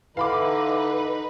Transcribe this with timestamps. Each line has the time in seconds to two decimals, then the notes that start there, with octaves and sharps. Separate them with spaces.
0.17 D3 E3 D#4 B4 F5 B5 D6